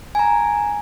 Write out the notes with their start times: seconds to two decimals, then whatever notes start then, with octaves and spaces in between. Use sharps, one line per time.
0.15 G#5 A#5